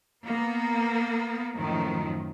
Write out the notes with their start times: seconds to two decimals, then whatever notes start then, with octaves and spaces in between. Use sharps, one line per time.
0.24 A#3 B3
1.55 F#2 A2 D#3 F3